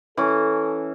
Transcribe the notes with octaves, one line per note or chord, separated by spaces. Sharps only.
E3 C#4 A4